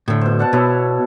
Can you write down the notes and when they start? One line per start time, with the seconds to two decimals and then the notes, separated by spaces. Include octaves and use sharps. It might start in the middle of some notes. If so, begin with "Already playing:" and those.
0.08 A2 D3
0.21 B2 C5
0.39 D5 F#5 A5
0.53 B2 E4 C#5